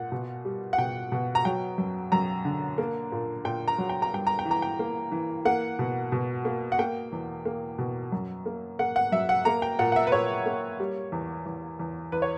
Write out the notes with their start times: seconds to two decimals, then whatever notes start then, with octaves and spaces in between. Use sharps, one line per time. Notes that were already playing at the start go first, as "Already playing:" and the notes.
Already playing: A#2 F#5
0.12 B2
0.45 G3
0.73 F#5
0.78 B2 G5
1.12 B2
1.35 A#5
1.45 F#3 G5
1.78 F#2
2.12 F#2 A#5
2.45 D3
2.78 A#3
3.12 A#2
3.45 A#2 G5
3.68 A#5
3.78 F#3
3.89 G5
4.02 A#5
4.12 G2 G5
4.27 A#5
4.39 G5
4.46 E3
4.51 A#5
4.62 G5
4.79 A#3
5.12 E3
5.45 A#3 F#5
5.79 B2
6.12 B2
6.45 A#3
6.72 F#5
6.79 A#3 G5
7.12 E2
7.45 A#3
7.78 B2
8.12 F#2
8.46 A#3
8.79 A#3 F#5
8.96 F#5
9.12 F#2 E5
9.29 F#5
9.45 A#3 A#5
9.62 G5
9.79 A#2 F#5
9.92 F#5
9.96 E5
10.07 B4
10.12 A#2 C#5
10.46 A#3
10.80 G3
11.12 E2
11.46 E2
11.79 E2
12.12 E2 B4
12.22 C#5